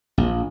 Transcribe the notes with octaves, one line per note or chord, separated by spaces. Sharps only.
A#1